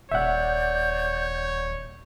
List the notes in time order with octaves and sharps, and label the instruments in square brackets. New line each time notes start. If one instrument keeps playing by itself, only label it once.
[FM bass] D#1 [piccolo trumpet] C#5 [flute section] D5 G6 [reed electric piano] E5 F#5